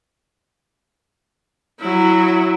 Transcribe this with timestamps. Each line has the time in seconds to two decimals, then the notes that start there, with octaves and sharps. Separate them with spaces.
1.80 F#3 E4